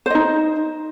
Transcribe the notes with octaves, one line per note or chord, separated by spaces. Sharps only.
D#4 C5 D#5